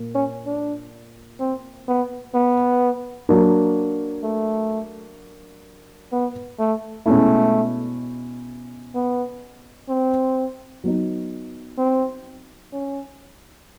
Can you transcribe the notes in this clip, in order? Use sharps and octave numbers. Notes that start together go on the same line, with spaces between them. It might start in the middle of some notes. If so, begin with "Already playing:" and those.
Already playing: A#2 A#3
C#4
D4
C4
B3
B3
F#3 A#3 D4
A3
B3
A3
B2 G#3 A3 C#4 E4
B3
C4
F#3 B3 D#4
C4
C#4